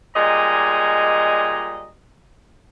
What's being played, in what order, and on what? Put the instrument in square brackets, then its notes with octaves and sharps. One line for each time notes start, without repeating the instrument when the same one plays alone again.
[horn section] A#2 G3 G#3 D#5 G#5 A#5